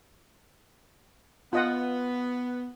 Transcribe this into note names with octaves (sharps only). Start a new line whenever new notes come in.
B3 F4 D#5 F#5